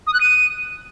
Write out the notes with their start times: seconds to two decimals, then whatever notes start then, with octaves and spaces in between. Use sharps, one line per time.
0.07 D#6
0.14 F#6
0.21 D#7